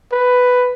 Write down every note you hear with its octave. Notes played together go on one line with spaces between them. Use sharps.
B4